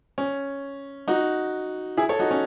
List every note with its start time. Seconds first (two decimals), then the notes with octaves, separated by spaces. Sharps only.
0.18 C#4
1.08 D#4 F#4
1.97 E4 G#4
2.09 A4 C#5
2.19 D#4 F#4
2.31 C#4